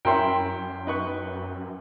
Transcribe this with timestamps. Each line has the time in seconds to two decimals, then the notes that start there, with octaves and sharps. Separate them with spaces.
0.05 F#2 C#4 E4 A#4 G5 C6
0.87 D#4 B4 C#6